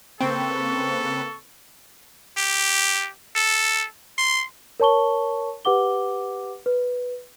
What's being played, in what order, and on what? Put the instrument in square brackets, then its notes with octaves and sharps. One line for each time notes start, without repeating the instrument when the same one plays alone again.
[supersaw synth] C#3 A#3 B4 [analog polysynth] C4 [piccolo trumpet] A4 [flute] C#6
[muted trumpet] G4
A4
C6
[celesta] A#4 C#5 A5 C#6 G7
G4 B4 F#5 D6 G7
B4